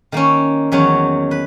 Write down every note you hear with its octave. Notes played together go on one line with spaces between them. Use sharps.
D#3 A#3 C#4
E2 D#3 F#3 C#4
B4